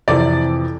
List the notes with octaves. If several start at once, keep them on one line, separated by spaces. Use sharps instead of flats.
F2 C3 E3 D5